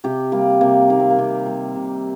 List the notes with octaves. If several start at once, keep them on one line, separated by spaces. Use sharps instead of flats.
C3 G4
G3 A#3
C3 A#3
D#3 A#3
C4
A#3
C3
G3
C3